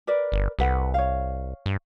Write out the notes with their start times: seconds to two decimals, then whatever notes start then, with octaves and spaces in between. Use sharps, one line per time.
0.07 A#4 B4 D5
0.32 G1
0.59 C2 A4 B4 F#5
0.94 C#5 F5
1.66 G2